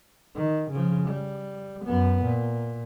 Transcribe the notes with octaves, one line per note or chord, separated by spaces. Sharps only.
D#3
C#3 F3
G3
F#2 B3
A#2